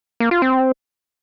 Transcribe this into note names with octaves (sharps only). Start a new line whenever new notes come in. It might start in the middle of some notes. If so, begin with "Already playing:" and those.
A#3
F4
C4